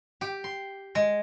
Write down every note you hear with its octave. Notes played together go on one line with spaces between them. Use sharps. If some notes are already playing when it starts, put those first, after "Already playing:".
G4
C6
G#3